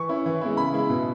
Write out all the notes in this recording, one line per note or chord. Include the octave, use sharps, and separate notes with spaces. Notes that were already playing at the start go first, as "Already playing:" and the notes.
Already playing: E3 C#6
C#4 E4
E3
G#3 B3 E4
C#3 B5
G#3 E4
B2